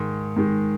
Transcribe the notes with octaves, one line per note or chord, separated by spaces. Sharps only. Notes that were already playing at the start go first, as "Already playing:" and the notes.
Already playing: G#2 D#3 G#3
G#2 D#3 G#3